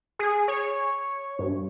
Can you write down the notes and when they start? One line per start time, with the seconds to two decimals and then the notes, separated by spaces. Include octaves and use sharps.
0.19 G#4
0.48 C#5
1.39 G2